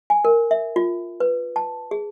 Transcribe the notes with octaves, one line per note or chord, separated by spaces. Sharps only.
G#5
A#4
E5
F4
B4
A5
G#4